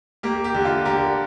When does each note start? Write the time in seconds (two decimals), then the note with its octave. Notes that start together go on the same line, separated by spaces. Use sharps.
0.23 A#3 G4
0.44 G4
0.54 D3
0.65 F4
0.85 D3 G4 A#4